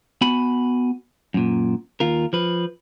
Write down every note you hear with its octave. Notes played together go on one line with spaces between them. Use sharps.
B3 F#4 G#5 B5
F#2 A#2
D#2 F4 A#4
F3 B4